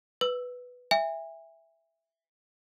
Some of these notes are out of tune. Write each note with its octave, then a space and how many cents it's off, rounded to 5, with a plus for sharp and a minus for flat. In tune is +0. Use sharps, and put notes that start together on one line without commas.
B4 +0 E6 +0
E5 +0 G#5 -40